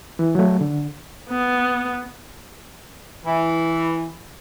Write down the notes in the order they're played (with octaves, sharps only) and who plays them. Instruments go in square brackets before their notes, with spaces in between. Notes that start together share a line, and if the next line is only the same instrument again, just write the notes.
[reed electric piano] E3
F#3 A3
D3
[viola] B3
[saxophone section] E3